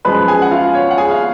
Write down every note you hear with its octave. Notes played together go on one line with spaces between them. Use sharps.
F#2 F3 G#3 B4 B5
G#4 G#5
F#5
F4 F5
C#5
F#5
G#4 G#5
F5